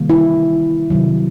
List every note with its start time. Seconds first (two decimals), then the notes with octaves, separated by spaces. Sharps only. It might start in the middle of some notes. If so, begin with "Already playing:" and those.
Already playing: C3 D#3 G3 A#3
0.10 E4
0.90 C3 D#3 F#3